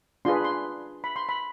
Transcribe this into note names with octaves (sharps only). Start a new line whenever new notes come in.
D4 F4 G#4 B4 C6
B5
C6
B5
C6
B5